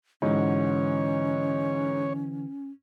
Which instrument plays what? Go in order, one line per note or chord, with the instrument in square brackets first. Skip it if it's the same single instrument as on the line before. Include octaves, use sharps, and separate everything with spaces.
[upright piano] G#2 [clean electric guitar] D3 E3 F#4 [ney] C#4 [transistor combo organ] C#5